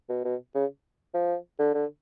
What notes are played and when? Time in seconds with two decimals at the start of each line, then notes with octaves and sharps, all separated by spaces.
0.09 B2
0.25 B2
0.54 C#3
1.14 F3
1.59 D3
1.74 D3